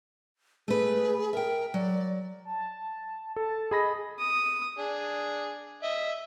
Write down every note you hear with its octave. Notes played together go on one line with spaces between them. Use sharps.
A3 G#4 B4
A#4 E5 G5
F#3 D5
A5
A4 A5
G#4 D#5 B5 A#6
D#6
D4 G#4
D#5 E5